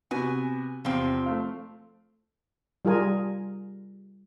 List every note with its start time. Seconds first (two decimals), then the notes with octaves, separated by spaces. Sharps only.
0.11 C3 B3 F#4 G#5
0.85 E2 C3 F3 C4
1.26 A3 F5
2.85 G3 F4 G#4 A#4 G#5